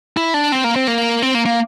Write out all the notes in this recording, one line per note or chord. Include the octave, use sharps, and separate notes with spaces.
E4
D4
C4
A#3
C4
A#3
C4
A#3
A#3